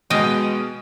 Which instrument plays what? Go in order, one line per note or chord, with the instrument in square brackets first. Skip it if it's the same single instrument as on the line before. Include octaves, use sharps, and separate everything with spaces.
[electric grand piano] B2 G#3 [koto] D#5 F5 G5